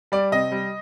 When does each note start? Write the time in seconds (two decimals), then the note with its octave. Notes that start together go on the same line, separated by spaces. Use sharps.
0.12 G3 D5
0.32 C3 D#5
0.52 G3